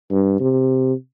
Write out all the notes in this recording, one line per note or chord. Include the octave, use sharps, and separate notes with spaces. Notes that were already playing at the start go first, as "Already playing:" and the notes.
G2
C3